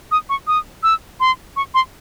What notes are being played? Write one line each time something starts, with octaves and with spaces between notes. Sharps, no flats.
D#6
C#6
D#6
E6
C6
C#6
C6